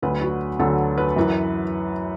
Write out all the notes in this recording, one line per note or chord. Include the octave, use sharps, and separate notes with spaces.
D2 D3 F#3 B4
F#4
D2 D3 F#3 A4
B4
F#2 E3